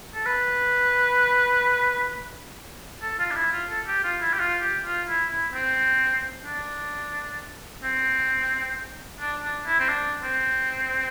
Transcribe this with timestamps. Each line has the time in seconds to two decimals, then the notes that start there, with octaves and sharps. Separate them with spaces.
0.15 A4
0.26 B4
3.02 A4
3.19 F4
3.31 D4
3.36 E4
3.52 F4
3.70 A4
3.87 G4
4.04 F4
4.21 E4
4.33 G4
4.39 F4
4.61 G4
4.85 F4
5.08 E4
5.31 E4
5.53 C4
6.45 D4
7.83 C4
9.20 D4
9.43 D4
9.67 E4
9.80 C4
9.89 D4
10.23 C4